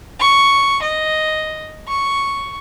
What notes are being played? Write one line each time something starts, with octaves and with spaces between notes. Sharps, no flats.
C#6
D#5
C#6